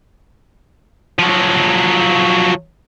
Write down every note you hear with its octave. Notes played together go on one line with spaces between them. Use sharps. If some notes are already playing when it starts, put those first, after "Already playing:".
F3 F#3